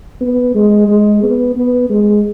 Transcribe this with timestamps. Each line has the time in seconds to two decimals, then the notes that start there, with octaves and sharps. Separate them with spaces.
0.21 B3
0.55 G#3
0.88 G#3
1.23 B3
1.56 B3
1.90 G#3